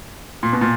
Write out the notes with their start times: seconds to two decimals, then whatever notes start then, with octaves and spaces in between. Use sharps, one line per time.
0.43 A#2
0.53 B2
0.61 A#2